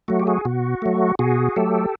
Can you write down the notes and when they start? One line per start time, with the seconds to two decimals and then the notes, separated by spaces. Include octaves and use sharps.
0.08 F#3 A3 F#4
0.20 G4
0.27 F#4 G#4
0.45 B2 F#4
0.82 F#3 A3
1.19 B2 F#4 G#4
1.56 F#3 A3 G4 A4